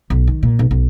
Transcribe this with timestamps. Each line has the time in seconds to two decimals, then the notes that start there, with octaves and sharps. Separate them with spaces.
0.10 B1
0.27 D#3
0.43 A#2
0.59 B1
0.71 B1